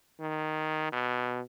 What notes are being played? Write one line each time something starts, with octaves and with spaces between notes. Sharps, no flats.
D#3
B2